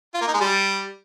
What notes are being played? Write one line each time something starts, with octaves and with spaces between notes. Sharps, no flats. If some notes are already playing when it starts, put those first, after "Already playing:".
F4
A#3
D#4
G#3
G3